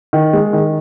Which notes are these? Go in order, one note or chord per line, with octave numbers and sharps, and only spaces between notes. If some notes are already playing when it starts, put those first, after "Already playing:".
D#3
G#3
D#3